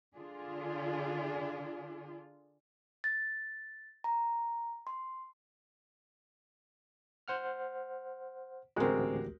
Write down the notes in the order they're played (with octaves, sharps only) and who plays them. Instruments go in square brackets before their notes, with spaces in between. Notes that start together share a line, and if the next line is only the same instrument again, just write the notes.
[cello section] D3 D4 F4 G#4
[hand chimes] A6
A#5
C6
[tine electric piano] C5 F#5 F6
[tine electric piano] A1 D2 G4 [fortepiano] G#3 C4 [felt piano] F#4 A#4